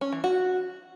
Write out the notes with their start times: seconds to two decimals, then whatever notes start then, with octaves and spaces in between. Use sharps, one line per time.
0.01 C#4
0.12 E3
0.24 F#4